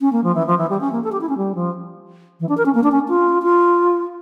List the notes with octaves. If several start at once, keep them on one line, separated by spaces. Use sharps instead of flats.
C#4
A#3
F3
E3
F3
E3
G3
C#4
A#3
A4
G4
E4
C#4
G3
F3
E3
D4
A#4
C#4
A#3
D4
C#4
F4
F4